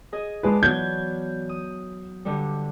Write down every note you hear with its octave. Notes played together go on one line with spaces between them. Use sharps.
G#4 D#5
G#3 G#4 B4 D5 A5
E3 F#3 B3 G6 G#6
D#6
G2 D3 G3